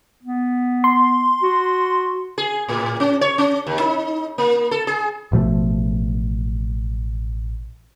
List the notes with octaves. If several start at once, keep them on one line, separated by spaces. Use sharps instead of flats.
B3
C6
F#4
G#4
A2
C#4
C#5
C#4
D#2
D#4
A#3
A4
G#4
A1 B2 F3 A3